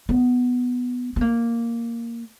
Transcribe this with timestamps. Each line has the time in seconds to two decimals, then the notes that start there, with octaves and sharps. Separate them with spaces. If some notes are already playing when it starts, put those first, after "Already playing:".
0.09 B3
1.16 B3
1.21 A#3